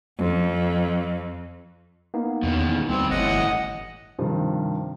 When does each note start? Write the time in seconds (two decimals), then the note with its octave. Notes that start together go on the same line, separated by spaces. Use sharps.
0.19 F2
2.14 A#3 B3 D#4
2.43 E2 B2 D#3
2.89 D2 G2 G3 C4
3.11 G1 A2 E3 D#5 F#5
4.19 G2 C3 D#3 F3